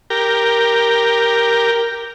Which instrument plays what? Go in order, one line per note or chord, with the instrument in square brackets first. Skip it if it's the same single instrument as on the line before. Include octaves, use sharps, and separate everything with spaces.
[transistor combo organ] G4 A#4